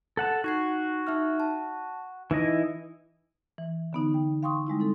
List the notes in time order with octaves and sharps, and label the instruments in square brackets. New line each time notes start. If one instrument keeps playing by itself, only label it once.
[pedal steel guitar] A4 F#5 A5
[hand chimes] D#4 G#6 C7 [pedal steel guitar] F#4
[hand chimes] D#4 E5 F6
A5
[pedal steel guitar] E3 E4 D#5 [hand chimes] D#4
[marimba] E3
D3 B3 D#4
G5
F5 G5 C6 C#6 D#6
G3 G#3 D#4 E4
C4 D#4 A4